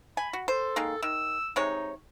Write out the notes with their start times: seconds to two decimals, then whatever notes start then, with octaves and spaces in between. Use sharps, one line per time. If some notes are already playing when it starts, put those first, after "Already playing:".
0.17 G#5 B5
0.33 F#4
0.48 A4 C5
0.76 D#3 G#3 A#3
1.03 D#3 E6
1.56 C3 G#3 D#4 C#5